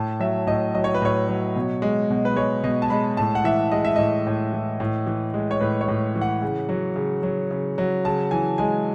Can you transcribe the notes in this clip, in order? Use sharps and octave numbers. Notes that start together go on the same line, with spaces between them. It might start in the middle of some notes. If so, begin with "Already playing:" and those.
Already playing: A2 A5
F#3 E5
A2 D#5
F#3 D#5
C#5
B4
A2 C#5
F#3
B2
G#3
B2
B4
G#3 C#5
B2 D#5
A5
G#3 B5
A2 A5
F#5
E3 E5
G#3 D#5
E5
A2 D#5
A2
E3
A2
E3
G#3
C#5
A2 B4
C#5
A2
E3
F#5
C#3
F#3
C#3
F#3
C#3
F#3
C#3 A5
E3 G#5
G#3 G#5